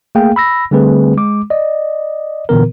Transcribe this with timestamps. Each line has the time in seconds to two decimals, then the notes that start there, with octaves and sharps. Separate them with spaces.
0.15 A3 A#3 G#4 F5 G5
0.36 B5 E6 A#6
0.71 D3 G3 A3 C4 G#4 B4
1.17 G#3 D6
1.50 D5 D#5
2.49 A#2 D3 E3 B3 A#4